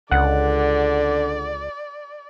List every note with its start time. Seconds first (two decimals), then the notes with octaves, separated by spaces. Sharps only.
0.12 C#2 D3 D5 F#5